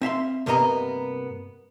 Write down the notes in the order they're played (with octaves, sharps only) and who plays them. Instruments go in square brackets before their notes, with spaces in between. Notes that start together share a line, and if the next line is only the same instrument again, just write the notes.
[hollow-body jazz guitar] C4 E5 F5 C6
G2 C3 A#3 B3 D#5 A#5